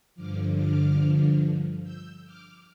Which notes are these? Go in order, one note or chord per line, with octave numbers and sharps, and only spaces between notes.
G2 D3 F3 D6 F6
D6 F6
E6 G6
D6 F6